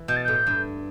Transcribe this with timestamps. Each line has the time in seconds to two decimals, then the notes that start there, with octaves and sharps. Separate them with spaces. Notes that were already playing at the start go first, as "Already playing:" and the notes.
Already playing: E3
0.08 B2 G6
0.16 A6
0.24 A2 G6
0.47 G2